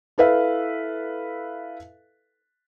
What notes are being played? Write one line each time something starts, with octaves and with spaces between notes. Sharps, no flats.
E4 A4 B4 E5 F5